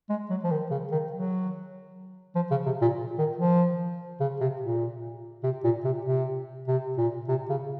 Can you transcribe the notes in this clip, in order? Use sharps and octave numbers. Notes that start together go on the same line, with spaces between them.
G#3
F#3
F3
D#3
C#3
D#3
F#3
F3
C#3
C3
A#2
D#3
F3
C#3
C3
A#2
C3
A#2
C3
C3
C3
A#2
C3
C#3